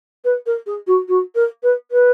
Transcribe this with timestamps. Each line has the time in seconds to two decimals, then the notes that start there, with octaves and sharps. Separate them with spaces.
0.24 B4
0.46 A#4
0.67 G#4
0.87 F#4
1.08 F#4
1.35 A#4
1.63 B4
1.91 B4